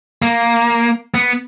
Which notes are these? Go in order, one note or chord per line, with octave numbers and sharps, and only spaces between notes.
A#3
B3